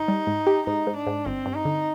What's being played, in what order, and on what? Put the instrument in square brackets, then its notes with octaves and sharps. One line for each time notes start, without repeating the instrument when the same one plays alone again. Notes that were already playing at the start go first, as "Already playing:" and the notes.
Already playing: [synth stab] G1 [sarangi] D#4
[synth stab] G3
G#2
G4
[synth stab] G#2 [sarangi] D#4
[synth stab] G#2
[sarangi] D4
[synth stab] G#2
[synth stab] G1 [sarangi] C4
[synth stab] G2
[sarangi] D#4
[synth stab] D3